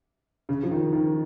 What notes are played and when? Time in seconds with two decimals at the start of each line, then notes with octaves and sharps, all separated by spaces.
0.49 C#3
0.63 F3
0.71 D#3
0.93 D#3